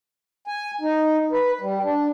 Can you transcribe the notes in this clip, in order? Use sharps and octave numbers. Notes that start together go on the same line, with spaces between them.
G#5
D#4
B4
G3
D4